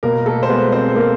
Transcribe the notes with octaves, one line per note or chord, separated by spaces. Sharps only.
B2 A#3 A#4
A3 A4
C5
G#3 B3 B4
C4 C5
A#3 A#4